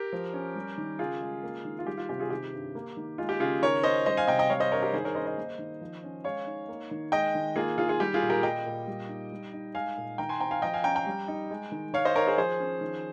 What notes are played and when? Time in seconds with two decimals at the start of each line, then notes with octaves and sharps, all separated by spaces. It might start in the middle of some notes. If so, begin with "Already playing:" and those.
Already playing: G4 A#4
0.13 F3
0.34 C#4
0.55 G3
0.78 D#3
0.99 C#3 F4 G#4
1.21 G#3
1.43 A#3
1.65 D#3
1.79 F4
1.87 G3 G4
1.97 F4
2.09 C3 G4
2.19 F4 G#4
2.30 D#3 G4
2.53 G2
2.75 A#3
2.97 D#3
3.18 G#3 F4
3.29 G4
3.40 C#3 F4 G#4
3.62 D#3 A#4 C#5
3.83 C#4 C5 D#5
4.06 G3 C5 D#5
4.17 F5 G#5
4.27 C3 D#5 G5
4.39 D#5 G5
4.49 G3 C#5 F5
4.60 C5 D#5
4.72 G2 A#4 C#5
4.82 G4 A#4
4.93 D#3 G#4 C5
5.04 A#4 C#5
5.15 C#4 C5 D#5
5.26 C5 D#5
5.37 A#3
5.59 D#3
5.81 F3
6.04 C#4
6.24 G#3 C#5 F5
6.47 D#4
6.68 A#3
6.91 D#3
7.12 G#3 D#5 G5
7.35 D#3
7.56 A#3 F4 G#4
7.78 D#3 F4 G#4
7.89 F4 G#4
8.00 G3 G4
8.14 F4 G#4
8.22 A#2
8.30 G4 A#4
8.43 G3 D#5 G5
8.66 A#2
8.87 G3
9.09 D#4
9.32 G3
9.53 D#4
9.75 G#3 F5 G#5
9.97 A#2
10.18 D#3 G5 A#5
10.29 G#5 C6
10.40 C4 G5 A#5
10.51 F5 G#5
10.62 F3 D#5 G5
10.73 F5 G#5
10.84 C#4 G5 A#5
10.95 G5 A#5
11.07 G3
11.28 D#4
11.51 G#3
11.72 D#3
11.93 D#3 C#5 F5
12.05 C5 D#5
12.16 D#4 A#4 C#5
12.27 G#4 C5
12.38 F3 G#4 C5
12.60 C#4
12.81 D#3